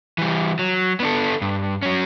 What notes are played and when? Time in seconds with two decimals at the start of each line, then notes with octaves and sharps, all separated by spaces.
0.18 E3 G3
0.59 F#3
1.00 B3 D4 A4
1.42 G2
1.82 F#3 C#4